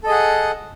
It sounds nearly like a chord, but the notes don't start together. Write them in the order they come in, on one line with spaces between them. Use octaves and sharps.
A4 D#5 G#4 F#5